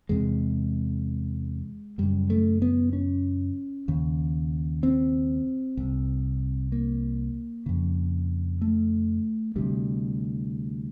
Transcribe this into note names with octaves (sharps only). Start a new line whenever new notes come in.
E2 C3 G#3
F#2 C#3 G3
A3
B3
C#4
D#2 C#3
C4
C2 C3
A#3
F2 C#3
A3
D2 C3 G3